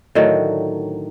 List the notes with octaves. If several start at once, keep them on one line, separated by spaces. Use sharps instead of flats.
A2 D3 D#3 F#3